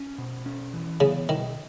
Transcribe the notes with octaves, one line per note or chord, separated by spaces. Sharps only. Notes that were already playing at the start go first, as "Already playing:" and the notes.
Already playing: C#4
B2
C#4
E3
C#3 B3
B2 D#3